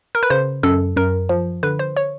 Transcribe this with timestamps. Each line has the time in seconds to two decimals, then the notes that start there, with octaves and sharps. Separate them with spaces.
0.15 A#4
0.23 B4
0.30 C#3 C5
0.63 F#2 A4
0.96 F#2 A#4
1.29 F3
1.63 D3 B4
1.79 C5
1.97 C#5